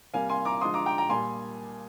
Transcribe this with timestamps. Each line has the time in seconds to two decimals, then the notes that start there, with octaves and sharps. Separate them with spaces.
0.14 C3 G3 A#3 F5 G#5
0.29 G#5 C6
0.45 A#5 D6
0.61 D3 F3 G#3 C6 D#6
0.74 A#5 D6
0.86 G5 A#5
0.98 G5 A#5
1.09 A#2 G3 A#3 G#5 C6